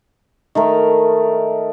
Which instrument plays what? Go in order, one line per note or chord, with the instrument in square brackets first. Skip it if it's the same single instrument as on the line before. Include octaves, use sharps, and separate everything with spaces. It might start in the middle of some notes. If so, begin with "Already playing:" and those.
[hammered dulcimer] D#3 A3 A#4